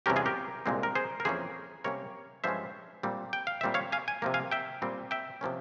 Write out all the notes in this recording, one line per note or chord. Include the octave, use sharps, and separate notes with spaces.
E2 C3 G3 C#4 G4 A#4
F4 G#4
G4 A#4
C2 A#2 G#3 C4
A#4
G#4 C5
A#4
F2 E3 A#3 C#4 G#4 C5
C3 G3 A#3 C#4 A#4 C#5
G2 F3 G#3 C#4 C5 E5
A#2 G3 C4
G5
F5
A#2 G3 C4 E5
C#5 F5
F5 G#5
G#5
C3 F3 A#3
F5 G#5
E5 G5
A#2 G3 C4
E5 G5
C3 F3 A#3 C#4